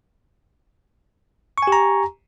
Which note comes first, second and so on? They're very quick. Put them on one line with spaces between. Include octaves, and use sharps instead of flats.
C#6 G#5 G4 A#5